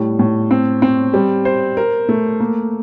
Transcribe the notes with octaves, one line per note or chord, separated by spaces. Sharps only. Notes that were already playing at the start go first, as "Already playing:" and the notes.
Already playing: A2 G3
A2
C4
C4
G3
C5
A#4
A3
A#3